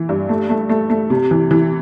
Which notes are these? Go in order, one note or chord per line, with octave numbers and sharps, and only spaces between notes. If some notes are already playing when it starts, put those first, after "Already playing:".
Already playing: E3
G2
A3
A3
A3
A3
C3
E3
E3